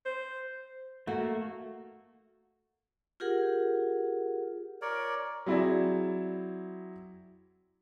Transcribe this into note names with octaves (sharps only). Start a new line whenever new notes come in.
C5
A3 A#3 F#4
F4 G4 G#4 A#4 F#5
A#4 C#5 D5
F#3 C4 E4 G#4 D5 E5